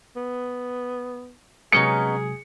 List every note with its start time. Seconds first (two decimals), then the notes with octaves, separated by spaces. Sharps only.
0.16 B3
1.72 C3 F#3 G#3 B3 C#4 D#4 G#4 C#7